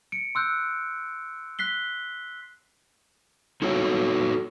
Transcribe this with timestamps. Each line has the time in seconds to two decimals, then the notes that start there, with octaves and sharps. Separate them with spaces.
0.12 C#7 D7
0.35 C6 E6 F#6 G6
1.59 F#6 B6 C7 G7
3.62 D#4 F#4 A4 C#5